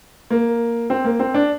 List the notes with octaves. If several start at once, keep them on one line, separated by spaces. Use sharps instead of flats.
A#3
C4
A#3
C4
D4